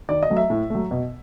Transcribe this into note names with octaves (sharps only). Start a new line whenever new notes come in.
D#3 D5
D#5
F#3 A3
E5
A2
F#3 A3
B2